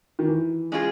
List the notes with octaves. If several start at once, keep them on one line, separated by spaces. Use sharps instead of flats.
D#3
E3
G#3 C#4 F4 G#4